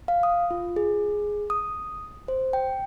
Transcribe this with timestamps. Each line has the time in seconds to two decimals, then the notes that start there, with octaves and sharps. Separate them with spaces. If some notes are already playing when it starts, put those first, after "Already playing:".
0.08 F5
0.23 D#6
0.51 F4
0.76 G#4
1.50 D#6
2.28 C5
2.53 G5